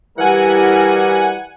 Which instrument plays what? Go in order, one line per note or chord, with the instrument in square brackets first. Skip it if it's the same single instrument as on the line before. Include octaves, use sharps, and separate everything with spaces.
[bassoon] E3 [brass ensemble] G3 [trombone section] E4 F#4 A#4 [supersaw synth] F#5 G#5